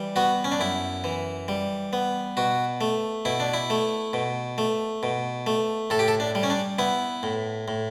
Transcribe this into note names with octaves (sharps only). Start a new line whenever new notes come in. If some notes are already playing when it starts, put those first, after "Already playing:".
Already playing: E3 G3
B3 F#4
C#4
D4
F#2 E4
E3
G3
B3
B2 F#4
A3
B2 E4
D4
E4
A3
B2
A3
B2
A3
A2 A4
G4
A4
D4
G3
C#4
D4
B3 E4
A2
A2